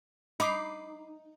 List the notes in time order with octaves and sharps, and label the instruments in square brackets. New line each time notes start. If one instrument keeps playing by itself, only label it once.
[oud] D#4 [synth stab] B5 D6 C7